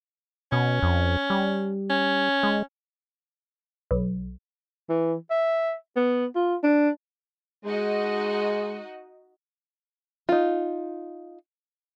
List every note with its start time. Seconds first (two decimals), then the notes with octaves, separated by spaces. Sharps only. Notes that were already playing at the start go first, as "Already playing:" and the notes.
0.52 B2 C#4
0.83 F2
1.30 G3
1.90 C#4
2.43 G#3
3.91 B1
4.89 E3
5.31 E5
5.96 B3
6.35 F4
6.63 D4
7.65 G#3 D#4 F#4 D#5
10.29 D#4 F4